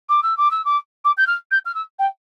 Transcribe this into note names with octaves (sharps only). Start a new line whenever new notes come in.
D6
E6
D6
E6
D6
D6
G6
F6
G6
F6
E6
G5